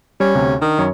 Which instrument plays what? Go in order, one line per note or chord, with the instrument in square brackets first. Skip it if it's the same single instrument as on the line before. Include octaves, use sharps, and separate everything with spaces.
[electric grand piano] G3 [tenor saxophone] C#4
[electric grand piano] D2 C3
[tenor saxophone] D#3 [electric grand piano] D4
[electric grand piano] F#2 C#5